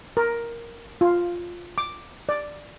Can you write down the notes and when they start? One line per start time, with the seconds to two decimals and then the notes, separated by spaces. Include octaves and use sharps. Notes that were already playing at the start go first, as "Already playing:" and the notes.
0.17 A#4
1.01 F4
1.78 D6
2.29 D5